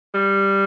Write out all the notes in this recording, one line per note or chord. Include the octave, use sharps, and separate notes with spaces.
G3